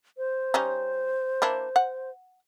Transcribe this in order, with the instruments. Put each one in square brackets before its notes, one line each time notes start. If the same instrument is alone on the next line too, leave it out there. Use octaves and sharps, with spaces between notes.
[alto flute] C5
[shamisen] G3 C#4 D#4
A#3 D4 E4
F#5